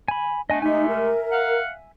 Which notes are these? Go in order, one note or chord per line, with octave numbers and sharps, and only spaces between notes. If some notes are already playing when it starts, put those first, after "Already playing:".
G#5 B5
A3 B3 D4 D#5 G#5
C3 G#3 A3 D#4 E5 G#5
A#4
F5 F#5